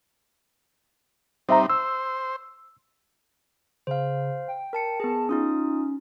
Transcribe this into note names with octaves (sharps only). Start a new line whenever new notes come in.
G3 C4 D#4 C5 E5 A#5
C5 E6
C#3 C5 F5
G5
A#4 A5 C#7
B3 G#4 A5
C#4 D#4 F4 D#6